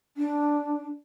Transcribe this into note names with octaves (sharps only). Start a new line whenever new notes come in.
D4